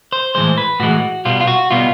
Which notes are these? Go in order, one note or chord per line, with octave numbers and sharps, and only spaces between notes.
C5
A2 E3 G#3 C5
B4
A2 E3 G#3 F#4
B2 G3 B3 F4
F4
F#4
B2 G3 B3 F4